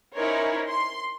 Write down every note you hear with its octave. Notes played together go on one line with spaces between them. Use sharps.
C#4 D#4 E4 A#4 C5 C#5
C6